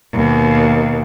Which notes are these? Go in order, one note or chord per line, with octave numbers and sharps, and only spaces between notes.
D#2 B2